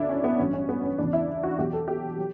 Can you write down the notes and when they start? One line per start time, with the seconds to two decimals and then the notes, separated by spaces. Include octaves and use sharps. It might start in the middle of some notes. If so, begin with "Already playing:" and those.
Already playing: D2 D3 F#3 D4 E4
0.09 C#4
0.24 B3
0.39 A1 G2 F#3 C#4
0.53 C#4
0.69 B3
0.83 C#4
0.98 E2 C#3 E3 D4
1.13 E4
1.43 F#4
1.58 E2 B2 F#3 G4
1.73 A4
1.88 G4
2.18 F#3